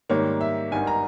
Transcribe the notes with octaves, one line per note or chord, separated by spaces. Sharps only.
G#2 D#3 G3 A#3 C#5
E5
G#1 G2 D#3 G#5
A#5